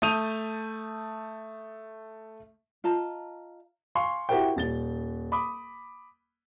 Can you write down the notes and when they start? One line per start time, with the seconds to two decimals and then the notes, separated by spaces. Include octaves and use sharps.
0.02 A3 A5 D#6 G6 D#7 F7
2.84 F4 D#5 A5 A#5
3.95 F5 G#5 C6 C#6
4.29 E4 F#4 G4 A#4 C5 G5
4.56 D#1 A6 G7
5.32 B5 D6 D#6